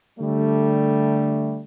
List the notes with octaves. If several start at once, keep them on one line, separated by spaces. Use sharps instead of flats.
D3 G3 A3